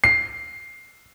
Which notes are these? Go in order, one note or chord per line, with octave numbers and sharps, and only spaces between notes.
C7